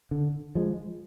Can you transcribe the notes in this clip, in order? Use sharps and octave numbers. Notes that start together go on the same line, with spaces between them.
D3
F3 G#3